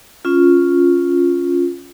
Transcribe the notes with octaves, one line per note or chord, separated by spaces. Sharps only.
C#4 F4